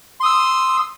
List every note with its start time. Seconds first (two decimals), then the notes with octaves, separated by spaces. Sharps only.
0.20 C6
0.23 D#6
0.25 E6